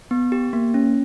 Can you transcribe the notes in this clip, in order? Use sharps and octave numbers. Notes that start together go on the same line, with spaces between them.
B3
G4
A#3
C#4